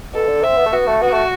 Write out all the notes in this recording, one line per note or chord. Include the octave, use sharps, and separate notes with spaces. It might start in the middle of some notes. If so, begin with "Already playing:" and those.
B2 A4
D3
C4 E5
B3
A3
B3 F#4
A3
B3 F#4
A3